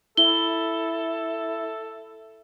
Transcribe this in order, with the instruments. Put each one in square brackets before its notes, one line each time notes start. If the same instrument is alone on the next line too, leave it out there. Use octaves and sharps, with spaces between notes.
[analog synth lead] E4 [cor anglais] A4 [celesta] G7